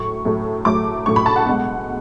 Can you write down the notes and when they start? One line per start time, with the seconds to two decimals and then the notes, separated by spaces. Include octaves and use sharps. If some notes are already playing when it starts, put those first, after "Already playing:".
Already playing: A2 F#3 A3 C#6
0.25 A2 F#3 A3
0.65 A2 F#3 A3 D6
1.06 A2 F#3 A3 C#6
1.16 B5
1.26 A5
1.36 F#5
1.46 B2 G#3